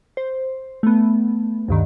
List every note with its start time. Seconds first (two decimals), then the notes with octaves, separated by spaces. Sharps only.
0.17 C5
0.83 A3 B3
1.68 D2 G2 D#3